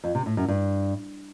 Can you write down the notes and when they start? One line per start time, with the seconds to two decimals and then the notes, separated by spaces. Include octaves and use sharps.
0.04 F2
0.15 C3
0.26 A2
0.37 F#2
0.48 G2